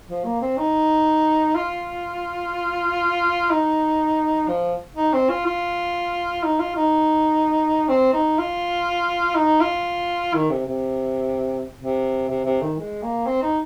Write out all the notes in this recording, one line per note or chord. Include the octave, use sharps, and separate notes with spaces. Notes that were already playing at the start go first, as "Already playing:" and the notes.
F3
A#3
C4
D#4
F4
D#4
F3
D#4
C4
F4
F4
D#4
F4
D#4
C4
D#4
F4
D#4
F4
D#3
C3
C3
C3
C3
C3
D#3
G#3
A#3
C4
D#4